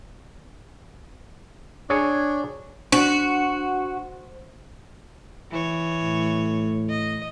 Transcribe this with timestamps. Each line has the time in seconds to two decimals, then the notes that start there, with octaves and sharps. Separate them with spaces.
1.90 D4 G#4 C#5
2.92 D4 F#4 C5
5.51 E3 C#5
6.01 A2
6.90 D#5